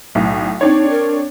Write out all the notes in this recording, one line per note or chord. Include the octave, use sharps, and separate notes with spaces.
B1 A2
C4 D4 D#4 C#5
A#4